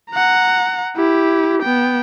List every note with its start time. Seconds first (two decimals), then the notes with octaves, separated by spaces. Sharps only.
0.11 F#5 A#5
0.96 E4 G4
1.62 B3 G5